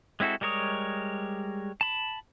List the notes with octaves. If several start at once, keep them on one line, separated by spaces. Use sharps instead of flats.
G#3 C4 E4 F#4 A4
G3 G#3 A#4 C#5 D#6
A5 B5